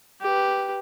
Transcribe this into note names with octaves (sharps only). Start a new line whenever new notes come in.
G4 B4